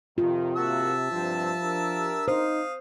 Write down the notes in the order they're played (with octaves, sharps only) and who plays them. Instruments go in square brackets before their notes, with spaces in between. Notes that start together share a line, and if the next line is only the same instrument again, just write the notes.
[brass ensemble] F2 D#3 [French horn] C3 [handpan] F4
[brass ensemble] G#1 A#3 F#4 [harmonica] E5 A5 E6
[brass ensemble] G2 C3 C4 [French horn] F3
[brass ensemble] D4 G4 A#4
[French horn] D#4 [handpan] C5 [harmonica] F5 D#6